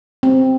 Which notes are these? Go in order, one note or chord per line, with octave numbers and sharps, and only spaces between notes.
C4